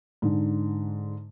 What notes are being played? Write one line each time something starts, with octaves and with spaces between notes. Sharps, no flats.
G#2 D3